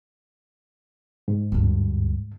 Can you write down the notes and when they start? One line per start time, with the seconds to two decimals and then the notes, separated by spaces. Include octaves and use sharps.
1.28 G#2
1.52 D2 G2